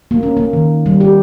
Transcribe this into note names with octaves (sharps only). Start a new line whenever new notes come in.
A#3
C#4
A#3
D#3
G3
G4